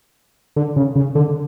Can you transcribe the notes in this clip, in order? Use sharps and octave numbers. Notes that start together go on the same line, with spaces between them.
D3
C#3
C#3
D3